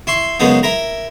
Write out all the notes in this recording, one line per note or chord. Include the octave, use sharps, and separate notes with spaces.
E4 C6 C#6
F#2 C#3 G#3 B3 D#4
E4 A#4 A#5